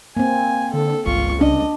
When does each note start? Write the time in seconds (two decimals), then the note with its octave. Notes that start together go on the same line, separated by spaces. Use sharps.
0.17 A#3 C4 G#5
0.74 D3 A4
1.06 G1 C#2 F4 C#6
1.41 C2 C#4 D4 D#5